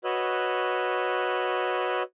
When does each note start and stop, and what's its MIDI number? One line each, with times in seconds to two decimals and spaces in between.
0.04 2.03 66
0.04 2.03 71
0.04 2.03 73
0.04 2.03 75
0.04 2.03 88
0.04 2.03 90